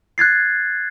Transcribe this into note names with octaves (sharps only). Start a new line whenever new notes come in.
F#6 G#6 A6 C7